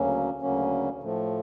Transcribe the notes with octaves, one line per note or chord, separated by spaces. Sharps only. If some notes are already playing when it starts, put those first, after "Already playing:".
Already playing: D2 C#3 F#3 A#3 C#4
D2 C#3 F#3 A#3 C#4
A2 F3 A3